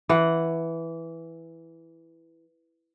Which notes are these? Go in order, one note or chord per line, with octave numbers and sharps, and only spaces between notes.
E3 F#5